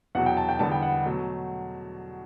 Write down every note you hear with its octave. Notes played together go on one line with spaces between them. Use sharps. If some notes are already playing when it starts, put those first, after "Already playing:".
E2 B2 F#3 F#5
G5
A5
G5
E2 D3 G3 B3 A5
G5
F#5
B2 F#3 A3